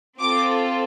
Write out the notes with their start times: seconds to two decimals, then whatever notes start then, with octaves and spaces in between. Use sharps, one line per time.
0.19 C4 F4 A4 D6